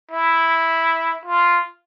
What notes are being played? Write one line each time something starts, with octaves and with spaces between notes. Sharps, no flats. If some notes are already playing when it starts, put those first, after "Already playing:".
E4
F4